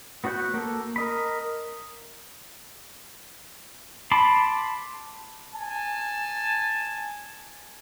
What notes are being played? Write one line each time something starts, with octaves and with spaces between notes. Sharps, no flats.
B3 F#4 C#5 F#5 G6
A#3 A4
A#4 D#5 B5
A5 B5 C6 D6
G#5 A5